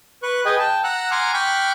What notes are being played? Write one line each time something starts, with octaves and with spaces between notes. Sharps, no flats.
B4 C#6 F#6
G#4 B4 D#5 G5 G#5
G5 A5
F#5 A#5 E6 F#6
F#5 G#5 A#5 C6 D6 F6
G5 B5 C#6 D6 F6 F#6